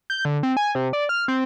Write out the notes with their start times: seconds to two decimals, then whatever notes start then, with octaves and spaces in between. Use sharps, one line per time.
0.10 G6
0.25 D3
0.43 C4
0.57 G#5
0.75 C3
0.93 D5
1.09 F6
1.28 C4